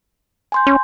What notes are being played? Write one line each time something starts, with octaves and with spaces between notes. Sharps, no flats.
G#5 C6 G6
C#4